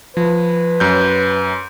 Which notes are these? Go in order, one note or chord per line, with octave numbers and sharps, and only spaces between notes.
F3 B4
F#2 G6